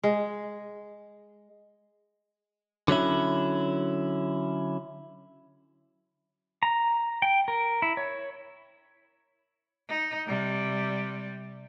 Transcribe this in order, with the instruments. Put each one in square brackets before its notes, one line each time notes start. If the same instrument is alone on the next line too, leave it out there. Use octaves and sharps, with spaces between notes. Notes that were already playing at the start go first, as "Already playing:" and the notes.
[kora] G#3
[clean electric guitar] D3 F#3 C#4 E4
[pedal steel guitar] A#5
G5
A#4
E4
C#5
[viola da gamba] D#4
C3 G3